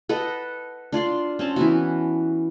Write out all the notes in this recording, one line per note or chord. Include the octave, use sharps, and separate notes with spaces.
A4 B4 D#5 F#5
D4 F4 D5 C6
C4 C#4 A5
E3 B3 F#4